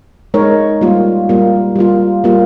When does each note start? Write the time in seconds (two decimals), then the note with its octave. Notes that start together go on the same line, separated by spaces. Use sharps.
0.34 G#3 D#4 A#4 C#5
0.81 G3 A#3 F4
1.29 G3 A#3 F4
1.76 G3 A#3 F4
2.24 G3 A#3 F4